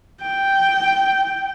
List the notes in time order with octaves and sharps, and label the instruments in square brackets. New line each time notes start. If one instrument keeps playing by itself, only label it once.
[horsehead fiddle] G5